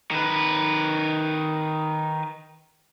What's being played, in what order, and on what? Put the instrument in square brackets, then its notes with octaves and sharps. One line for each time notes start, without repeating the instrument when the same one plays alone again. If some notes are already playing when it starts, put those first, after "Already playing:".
[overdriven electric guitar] D#3 B4